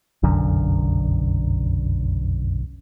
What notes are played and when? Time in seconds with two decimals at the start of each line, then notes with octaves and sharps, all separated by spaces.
0.23 F1 B1 F#2 D3